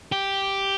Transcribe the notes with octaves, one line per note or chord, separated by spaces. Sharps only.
G4